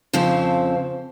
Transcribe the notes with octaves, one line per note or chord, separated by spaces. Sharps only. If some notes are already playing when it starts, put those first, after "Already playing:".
F2 C#3 F3 C4